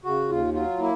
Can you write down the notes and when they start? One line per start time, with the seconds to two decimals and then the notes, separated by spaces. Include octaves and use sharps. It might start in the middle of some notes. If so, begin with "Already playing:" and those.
0.04 C#3 F#4
0.29 D#2 F4
0.54 F#3 F4
0.79 A#3 E4